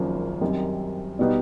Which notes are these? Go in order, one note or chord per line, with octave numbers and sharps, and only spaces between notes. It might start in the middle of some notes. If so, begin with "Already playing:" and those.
Already playing: G#1 F#2 C#3 F3 A#3
F#2 D#3 G3 C4
B2 G3 B3 D#4